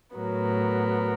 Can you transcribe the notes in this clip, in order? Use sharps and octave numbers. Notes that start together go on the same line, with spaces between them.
A2 F#3 B3 A#4